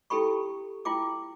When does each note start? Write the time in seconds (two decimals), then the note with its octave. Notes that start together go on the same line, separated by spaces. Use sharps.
0.10 E4 G4 A4 G5 B5 C#6
0.85 E4 F4 G5 D6